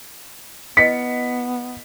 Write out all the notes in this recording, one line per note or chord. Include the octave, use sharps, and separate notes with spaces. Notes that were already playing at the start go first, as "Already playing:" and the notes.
B3 E4 B4 D#5 B6 C#7